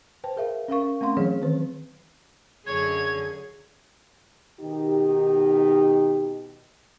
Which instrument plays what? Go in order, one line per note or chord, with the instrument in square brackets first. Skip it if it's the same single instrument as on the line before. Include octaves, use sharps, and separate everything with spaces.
[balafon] B4 C5 G5 A5
G#4 A#4 E5 F5
C#4 A#4 F5 C#6
A3 C4 C#4 F5 C6
E3 F#3 G#4 C#5
D#3 E3 C4 B4
[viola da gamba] F#2 D3 G#4 [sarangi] C#5 [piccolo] G#6
[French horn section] B2 D#3 D#4 G4